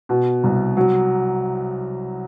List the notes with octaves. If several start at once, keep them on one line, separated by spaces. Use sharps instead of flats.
B2
C2
F#3